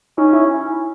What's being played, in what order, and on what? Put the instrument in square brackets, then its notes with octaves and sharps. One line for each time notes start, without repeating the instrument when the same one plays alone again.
[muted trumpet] C#4 [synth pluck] D#4
[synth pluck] E4